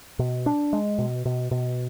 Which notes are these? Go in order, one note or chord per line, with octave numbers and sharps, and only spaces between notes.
B2
D4
G#3
B2
B2
B2